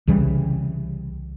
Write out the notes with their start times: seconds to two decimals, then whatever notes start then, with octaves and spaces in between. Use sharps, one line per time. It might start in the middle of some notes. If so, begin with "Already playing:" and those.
0.07 C2 C#3 E3 G3